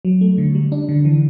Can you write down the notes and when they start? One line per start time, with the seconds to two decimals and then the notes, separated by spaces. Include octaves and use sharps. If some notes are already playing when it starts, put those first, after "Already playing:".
0.05 F#3
0.21 A3
0.38 D3
0.55 G3
0.72 D4
0.89 D3
1.05 E3